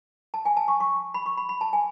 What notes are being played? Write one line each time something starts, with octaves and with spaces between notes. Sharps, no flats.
A5
G#5
A5
C#6
C#6
B5
C#6
B5
B5
A5
G#5